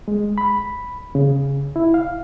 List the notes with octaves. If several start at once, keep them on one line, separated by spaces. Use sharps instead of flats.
G#3
B5
C#3
E4
F5